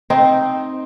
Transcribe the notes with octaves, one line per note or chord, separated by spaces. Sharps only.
C4 D#4